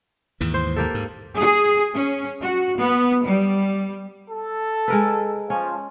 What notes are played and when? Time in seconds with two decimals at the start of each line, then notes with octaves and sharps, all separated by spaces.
0.41 D#2 G#2 E3
0.54 C5
0.76 A#3 G4 A4
0.94 G#2
1.37 G#4
1.93 C#4
2.41 F#4
2.79 B3
3.25 G3
4.31 A4
4.88 G#3 A#4 B4
5.50 F3 C#4